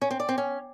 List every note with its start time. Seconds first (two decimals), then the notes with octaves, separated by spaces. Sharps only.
0.01 C#4
0.11 C4
0.20 D5
0.29 C4
0.38 C#4